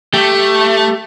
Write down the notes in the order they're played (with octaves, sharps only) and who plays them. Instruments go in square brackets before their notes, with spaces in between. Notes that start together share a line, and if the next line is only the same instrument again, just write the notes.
[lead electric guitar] A3 [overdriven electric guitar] G4